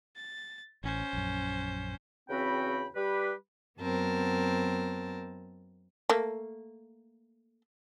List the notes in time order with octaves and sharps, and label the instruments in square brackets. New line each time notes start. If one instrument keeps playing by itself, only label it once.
[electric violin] A6
[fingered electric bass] A1 [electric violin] C#4 C5
[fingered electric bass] A#1 F#2
[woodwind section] E2 C#3 C4 F#4 G5 B5
G3 G4 B4
[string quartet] F#2 B3 C4 A#4 A5
[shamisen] A3 A#3